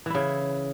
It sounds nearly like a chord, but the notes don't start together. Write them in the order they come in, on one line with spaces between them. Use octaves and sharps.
E3 E4 C#3